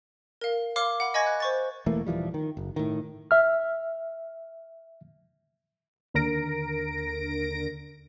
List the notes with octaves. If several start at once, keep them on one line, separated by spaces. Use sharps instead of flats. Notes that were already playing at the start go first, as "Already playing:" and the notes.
A#4 F5
C#5 F5 C6 D6 F6
F#5 B5
D#5 G#5 B5 C#6 G#6 A#6
F#6
C5 C#6 A6
E1 E3 A3 A#3
D#1 E3 F3 G3
D#3
F#1
A2 D#3
E5 F6
D#2 D3 A#4 A#6 D7